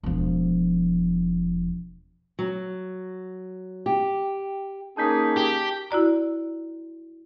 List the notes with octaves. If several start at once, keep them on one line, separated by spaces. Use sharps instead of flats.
E1 F3
F#3
G4
A#3 C#4 D#4 G#4 A5 G6 B6
G4
E4 F#4 D5 A#5